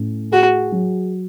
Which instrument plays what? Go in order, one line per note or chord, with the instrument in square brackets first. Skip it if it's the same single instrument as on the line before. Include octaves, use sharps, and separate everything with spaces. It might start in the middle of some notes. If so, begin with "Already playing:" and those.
Already playing: [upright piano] A2 C#4
[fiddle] F#4 [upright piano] G#4
[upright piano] F#3